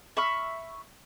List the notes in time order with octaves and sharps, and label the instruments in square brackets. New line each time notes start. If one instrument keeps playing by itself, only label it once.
[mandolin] E5 B5 C#6 F6